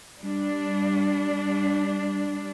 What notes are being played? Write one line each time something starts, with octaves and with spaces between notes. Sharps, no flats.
G3 D4